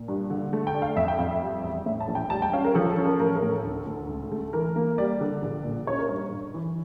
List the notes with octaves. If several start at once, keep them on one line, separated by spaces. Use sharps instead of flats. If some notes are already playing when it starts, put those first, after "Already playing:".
Already playing: A#2
G2
D3
A3
G5
D4
F5
F2 E5
G5
F2 F5
E5
G3
E2
A2 E5
A5
A#1
G5
G3 A5
G5
C#4 F5
A#4
F3 A4
A4
C#4
A#4
A1 A#4
A#4
A2
A4
D2
D2
C#2
A3
E3 A#4
A#3
G3 D5
D3
A#1
A#2
C#4 C#5
A#4
G2 C#5
G1
E3